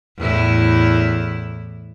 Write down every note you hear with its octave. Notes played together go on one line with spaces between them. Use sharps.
E2 A2 E4